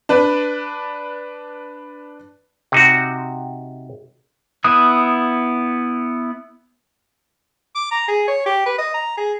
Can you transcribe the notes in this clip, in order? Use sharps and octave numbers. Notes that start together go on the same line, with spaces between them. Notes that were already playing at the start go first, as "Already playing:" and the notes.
D4 B4
C3 D#4 F#4
B3 E4 D#6 F#6
D6
A#5
G#4
C#5
G4
B4
D#5
A#5
G#4